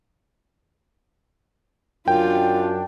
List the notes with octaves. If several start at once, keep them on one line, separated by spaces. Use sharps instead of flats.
F#2 D4 F4 G5